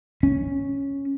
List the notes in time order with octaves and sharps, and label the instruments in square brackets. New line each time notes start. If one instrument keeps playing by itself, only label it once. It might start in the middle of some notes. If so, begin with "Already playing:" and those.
[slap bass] C#4